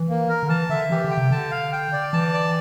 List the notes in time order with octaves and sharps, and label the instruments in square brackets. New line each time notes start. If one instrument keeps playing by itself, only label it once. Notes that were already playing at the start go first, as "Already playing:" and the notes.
Already playing: [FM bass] E3
[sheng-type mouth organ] A#3
A#4
[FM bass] D3
[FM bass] E3 [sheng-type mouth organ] A5
[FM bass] D3 [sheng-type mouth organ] E5
[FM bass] E3 [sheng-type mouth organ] G4
[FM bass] D3
[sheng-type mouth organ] G5
[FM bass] C3
[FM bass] D3 [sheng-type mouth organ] A5
[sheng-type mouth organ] F5
G5
D5
[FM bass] E3 [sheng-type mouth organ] A5
[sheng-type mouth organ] D5